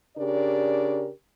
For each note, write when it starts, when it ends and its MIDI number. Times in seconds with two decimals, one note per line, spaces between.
0.17 1.10 49
0.17 1.10 62
0.17 1.10 67
0.17 1.10 70
0.17 1.10 74